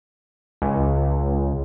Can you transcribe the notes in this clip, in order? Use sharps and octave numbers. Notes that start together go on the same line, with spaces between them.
C#2